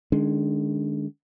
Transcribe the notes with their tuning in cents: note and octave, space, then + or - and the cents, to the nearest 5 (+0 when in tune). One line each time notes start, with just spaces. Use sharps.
D#3 -45 G#3 +5 D4 -45